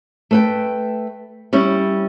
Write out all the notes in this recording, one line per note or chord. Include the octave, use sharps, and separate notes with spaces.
A3 B4 G5
G3 C#4 E4